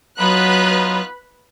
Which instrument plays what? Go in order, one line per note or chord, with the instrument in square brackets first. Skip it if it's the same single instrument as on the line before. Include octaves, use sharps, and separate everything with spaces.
[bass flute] F#3 [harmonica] B3 D#4 F4 [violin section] B4 B5 F#6